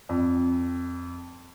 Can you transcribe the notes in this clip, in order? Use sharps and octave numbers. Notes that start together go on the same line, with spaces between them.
F2